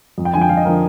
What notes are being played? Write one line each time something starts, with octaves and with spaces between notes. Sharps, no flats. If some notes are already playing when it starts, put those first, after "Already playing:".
F2
G5
D3 F3 G5 G#5
F2 F5
D#5
D3 F3 A#4